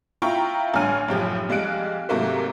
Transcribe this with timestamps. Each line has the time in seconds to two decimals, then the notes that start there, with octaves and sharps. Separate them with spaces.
0.22 E4 F4 G5 A#5 C#6
0.74 A1 G2 D3 G#5 F6 D#7
1.08 F#1 B1 A2 F3 G4
1.49 F2 G3 G#3 F5 F#6 D7
2.09 G#2 C3 F#3 A3 A#3